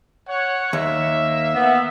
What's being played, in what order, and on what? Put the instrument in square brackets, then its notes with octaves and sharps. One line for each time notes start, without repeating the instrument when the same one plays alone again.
[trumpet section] C#5 F#5
[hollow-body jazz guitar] D#2 [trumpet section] A#3 E5
[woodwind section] B3